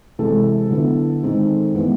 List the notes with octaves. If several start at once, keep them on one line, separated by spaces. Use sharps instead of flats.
C3 E3 G#3 A4
D3 F#3 B3 E4
D#3 G#3 C4 D#4
E3 G#3 B3